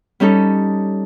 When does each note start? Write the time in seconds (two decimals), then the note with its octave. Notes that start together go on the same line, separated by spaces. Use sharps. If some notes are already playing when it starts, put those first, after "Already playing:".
0.20 G3 C#4 D#4 A4